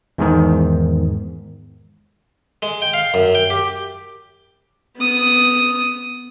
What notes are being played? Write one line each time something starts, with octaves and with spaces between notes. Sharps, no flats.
E2 G#2 D#3
G#3
G5
F5
F#2
G5
G4
B3 D#6